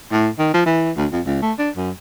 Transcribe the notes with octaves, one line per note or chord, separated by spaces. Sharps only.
A2
D#3
F3
E3
D2
F2
C#2
A3
D4
F#2